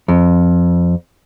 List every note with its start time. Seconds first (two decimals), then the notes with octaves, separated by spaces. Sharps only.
0.08 F2